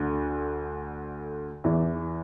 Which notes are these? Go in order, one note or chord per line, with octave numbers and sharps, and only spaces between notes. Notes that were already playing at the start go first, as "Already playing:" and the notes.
Already playing: D2 D3
E2 E3